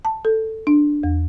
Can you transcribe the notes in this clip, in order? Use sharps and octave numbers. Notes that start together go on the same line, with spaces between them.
A5
A4
D4
E2